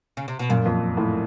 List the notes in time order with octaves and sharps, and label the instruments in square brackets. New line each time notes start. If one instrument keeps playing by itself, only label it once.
[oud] C#3
C3
B2
[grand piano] F#2 [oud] A#2
[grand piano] F2
A2